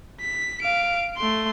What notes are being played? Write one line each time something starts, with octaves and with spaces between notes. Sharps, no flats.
B6
F5 D7
A3 C6